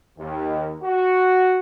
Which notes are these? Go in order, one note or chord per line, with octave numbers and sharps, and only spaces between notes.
D#2
F#4